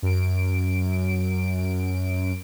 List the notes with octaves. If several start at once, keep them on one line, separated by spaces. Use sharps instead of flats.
F#2 D7